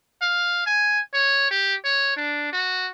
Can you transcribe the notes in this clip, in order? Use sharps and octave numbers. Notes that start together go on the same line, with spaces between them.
F5
G#5
C#5
G4
C#5
D4
F#4